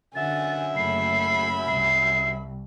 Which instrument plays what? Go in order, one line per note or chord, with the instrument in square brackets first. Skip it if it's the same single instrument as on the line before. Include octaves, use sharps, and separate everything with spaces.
[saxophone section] F#2 E5 [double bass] D3 [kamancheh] F#5 G#5 [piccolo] A6
[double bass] F#1 A3 [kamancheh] B5 [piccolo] C7
[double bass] C2 [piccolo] C7